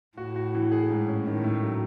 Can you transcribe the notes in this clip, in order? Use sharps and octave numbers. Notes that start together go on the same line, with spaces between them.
A2 F#4
F#4
E3
G#4
G#2
C#4
A2 D#3
A3
F#3